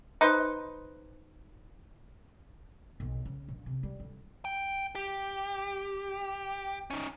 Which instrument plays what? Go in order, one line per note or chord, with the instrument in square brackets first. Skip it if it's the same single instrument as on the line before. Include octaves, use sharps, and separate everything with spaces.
[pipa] D#4 B4 C5
[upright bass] B1
C#3
A#1
C3
G3
D3
[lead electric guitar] G5
G4
C#4 D#4